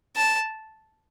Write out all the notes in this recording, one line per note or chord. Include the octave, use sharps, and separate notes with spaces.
A5